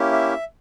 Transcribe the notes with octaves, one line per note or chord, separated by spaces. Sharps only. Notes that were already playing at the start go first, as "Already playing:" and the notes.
Already playing: A#3 C#4 E4 G4
E5